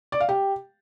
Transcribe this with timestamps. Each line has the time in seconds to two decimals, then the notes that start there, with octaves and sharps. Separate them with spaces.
0.12 D5
0.20 F5
0.29 G4